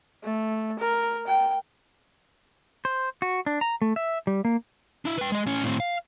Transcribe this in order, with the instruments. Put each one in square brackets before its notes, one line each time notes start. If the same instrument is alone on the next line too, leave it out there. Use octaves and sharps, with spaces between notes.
[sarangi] A3
A#4
G5
[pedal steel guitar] C5
F#4
D4
A#5
A3
E5
G3
A#3
[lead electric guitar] D4 E4
B4 G5
G#3 D#5
A2 C#4
A2 C4
F5